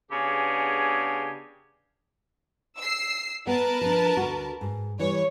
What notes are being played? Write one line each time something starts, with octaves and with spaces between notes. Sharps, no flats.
C#3 B3 D4 G4 G#4
E6 C7
B3 A#4 B4 A5
F3 D4
D2 F#4
G#2
E3 G3 C#5